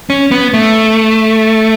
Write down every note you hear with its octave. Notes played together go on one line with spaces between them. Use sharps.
C#4
B3
A3